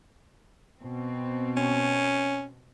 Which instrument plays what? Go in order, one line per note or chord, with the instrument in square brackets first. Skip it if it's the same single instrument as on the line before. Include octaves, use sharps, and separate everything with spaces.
[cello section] B2 C4
[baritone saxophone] C#4